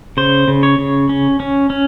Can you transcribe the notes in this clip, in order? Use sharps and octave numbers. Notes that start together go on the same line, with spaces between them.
C#3 C5
C#3
C#5
C#3
C#4
C#4
C#4